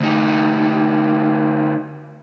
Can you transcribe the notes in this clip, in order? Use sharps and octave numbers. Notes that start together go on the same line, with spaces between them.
D2 D#4